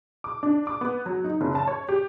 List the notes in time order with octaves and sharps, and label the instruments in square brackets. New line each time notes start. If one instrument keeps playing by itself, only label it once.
[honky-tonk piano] D6
D4
D6
B3
F#3
D#4
F#1
A5
C#5
G4